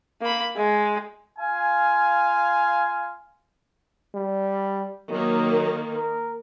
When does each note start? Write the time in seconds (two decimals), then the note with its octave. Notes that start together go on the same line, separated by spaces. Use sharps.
0.21 A#3 B5
0.56 G#3
1.39 F4 F5 G#5
4.15 G3
5.10 D#3 F#3 A#3
5.96 A#4